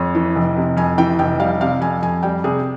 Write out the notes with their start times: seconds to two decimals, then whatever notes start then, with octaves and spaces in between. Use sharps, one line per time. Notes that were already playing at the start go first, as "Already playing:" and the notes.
Already playing: F2 C#5
0.15 E3
0.36 F1
0.56 C3
0.77 F2 G#5
0.98 E3 G5
1.19 F1 G5
1.39 G3 F5
1.61 C3 F5
1.81 F2 G#5
2.03 F2 G#5
2.23 G3 G5
2.44 C3 G#4